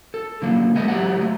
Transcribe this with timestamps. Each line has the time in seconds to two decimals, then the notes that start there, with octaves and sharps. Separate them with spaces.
0.14 A4
0.42 D3 F#3 A#3
0.76 G#3 B3 B4 D#5 E5
0.88 F#3 G4 D5 E5 F#5
1.19 F#3 A3